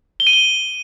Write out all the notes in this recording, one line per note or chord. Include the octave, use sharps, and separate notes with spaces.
G7
D#7
G7